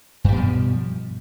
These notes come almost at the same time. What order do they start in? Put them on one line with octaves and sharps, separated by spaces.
G2 G3 B2 F3